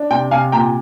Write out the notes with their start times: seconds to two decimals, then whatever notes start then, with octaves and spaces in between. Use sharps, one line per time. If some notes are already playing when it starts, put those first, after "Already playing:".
Already playing: D4
0.11 C3 G5
0.31 C3 F5 G#5
0.52 A#2 G5 A#5